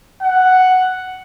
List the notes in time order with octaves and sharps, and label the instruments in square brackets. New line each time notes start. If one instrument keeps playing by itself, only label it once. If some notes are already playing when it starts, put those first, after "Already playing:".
[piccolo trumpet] F#5